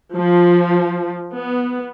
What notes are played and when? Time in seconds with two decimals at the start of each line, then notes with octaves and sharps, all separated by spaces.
0.15 F3
1.33 B3